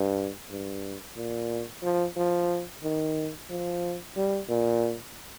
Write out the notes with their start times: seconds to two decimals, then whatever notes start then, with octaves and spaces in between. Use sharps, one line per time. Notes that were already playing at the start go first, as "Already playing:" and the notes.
Already playing: G2
0.51 G2
1.17 A#2
1.83 F3
2.17 F3
2.84 D#3
3.50 F3
4.17 G3
4.49 A#2